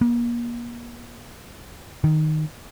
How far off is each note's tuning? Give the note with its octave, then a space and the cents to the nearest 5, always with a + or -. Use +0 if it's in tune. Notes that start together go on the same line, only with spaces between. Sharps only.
A#3 +35
D#3 -5